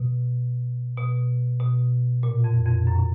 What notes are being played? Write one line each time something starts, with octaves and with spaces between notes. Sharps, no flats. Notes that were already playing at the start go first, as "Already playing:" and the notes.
Already playing: B2
B2
B2
A#2
F2
F2
F#2